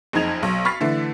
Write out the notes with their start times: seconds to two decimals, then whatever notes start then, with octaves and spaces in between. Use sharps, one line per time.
0.13 F#1 F2 D#4 G#6 F7
0.43 B1
0.65 B5 C#6 F6 A6 B6 C7
0.80 D3 E3 A3